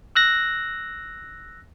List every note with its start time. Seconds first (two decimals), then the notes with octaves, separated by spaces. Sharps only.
0.16 E6 F#6 A#6